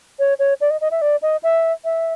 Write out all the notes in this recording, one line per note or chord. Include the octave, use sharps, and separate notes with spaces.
C#5
C#5
D5
D#5
D#5
E5
D5
D#5
E5
E5